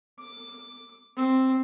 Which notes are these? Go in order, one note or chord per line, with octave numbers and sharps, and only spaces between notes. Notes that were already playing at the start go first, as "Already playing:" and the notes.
D6
C4